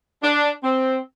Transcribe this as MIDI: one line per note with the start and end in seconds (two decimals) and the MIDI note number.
0.23 0.49 62
0.63 0.97 60